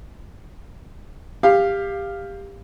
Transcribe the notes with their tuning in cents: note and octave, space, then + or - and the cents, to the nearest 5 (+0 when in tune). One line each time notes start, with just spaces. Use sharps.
G4 +20 F5 +0